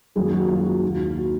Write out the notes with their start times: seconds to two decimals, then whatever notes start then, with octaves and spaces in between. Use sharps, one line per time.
0.15 F#2 D#3 F#3 A#3 G#4
0.33 F#4
0.49 F4
0.66 F#4
0.82 D#2 D#3 A#3
1.17 F#4